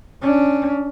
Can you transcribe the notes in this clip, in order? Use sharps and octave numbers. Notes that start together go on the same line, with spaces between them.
C#4 D4